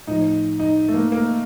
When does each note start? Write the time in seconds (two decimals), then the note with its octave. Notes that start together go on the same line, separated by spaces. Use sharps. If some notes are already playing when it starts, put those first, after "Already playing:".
0.07 A2 F3 D#4
0.60 D#4
0.88 A3
0.94 A#3
1.12 A#3